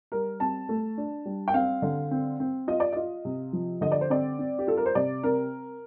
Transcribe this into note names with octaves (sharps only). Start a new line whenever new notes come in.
G3 A#4
C4 A5
A3
D4
G3
G5
C4 F5
D3
C4
C4
F4 D#5
D5
F4 D#5
C3
F3
D3 D#5
D5
C5
C4 D5
C4
G4
F4 A4
A#4
C5
C3 D5
C4 A#4